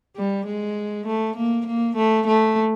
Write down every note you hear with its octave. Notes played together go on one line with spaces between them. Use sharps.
G3
G#3
A3
A#3
A#3
A3
A3